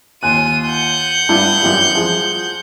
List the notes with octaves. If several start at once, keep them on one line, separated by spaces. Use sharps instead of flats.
D#2 F4 G#5 F#6 D#7
F#5 G6
G2 D4 E4
F#2 E3 G3
F3 G#4